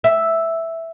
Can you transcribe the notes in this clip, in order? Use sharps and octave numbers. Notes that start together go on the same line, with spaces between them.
E5